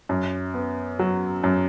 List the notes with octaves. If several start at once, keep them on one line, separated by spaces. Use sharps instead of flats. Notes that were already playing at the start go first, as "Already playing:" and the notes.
F#2
B3
F#3
F#2